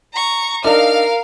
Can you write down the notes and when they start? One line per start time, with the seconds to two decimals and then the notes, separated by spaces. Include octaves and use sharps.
0.14 A#5 C#6
0.64 D4 D#4 A#4 F5 F6